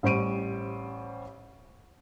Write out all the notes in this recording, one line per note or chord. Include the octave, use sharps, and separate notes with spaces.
A1 G3 C5 C#6 D7 D#7